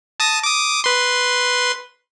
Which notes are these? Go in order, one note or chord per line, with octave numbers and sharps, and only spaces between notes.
A5 D#6 A#6
D6 D#6
B4 C6